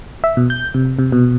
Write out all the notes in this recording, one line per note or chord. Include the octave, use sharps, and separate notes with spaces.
E5
B2
G6
C3
C3
B2